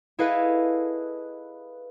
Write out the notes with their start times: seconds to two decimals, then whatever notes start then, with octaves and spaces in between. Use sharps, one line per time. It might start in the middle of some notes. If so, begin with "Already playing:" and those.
0.19 E4 G#4 A4 B4 D#5 F5